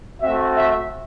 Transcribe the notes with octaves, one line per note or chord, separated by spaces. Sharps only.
A3 C4 F#4 E5
E5